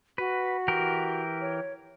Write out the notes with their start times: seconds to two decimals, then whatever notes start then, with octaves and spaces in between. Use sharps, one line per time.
0.18 F#4 B4
0.68 E3 G4 A#4
1.41 C#5